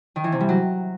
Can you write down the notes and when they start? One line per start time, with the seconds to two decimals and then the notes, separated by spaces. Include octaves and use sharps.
0.16 D#3
0.24 E3
0.32 C3
0.40 G3
0.49 F#3